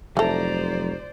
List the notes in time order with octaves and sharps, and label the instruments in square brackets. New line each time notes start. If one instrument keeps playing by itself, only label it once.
[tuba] F1 [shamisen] E3 A4 [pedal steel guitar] F#3 A#5 [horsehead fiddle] C5 D5